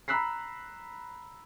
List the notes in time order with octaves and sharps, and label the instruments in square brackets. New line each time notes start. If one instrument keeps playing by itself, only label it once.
[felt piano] A#5 B5 E6 F#6 B6 C7